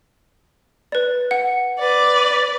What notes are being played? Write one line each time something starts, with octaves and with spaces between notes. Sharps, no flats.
B4 D5
F#5
B4 D5